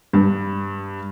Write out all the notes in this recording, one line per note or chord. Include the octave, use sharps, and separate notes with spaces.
G2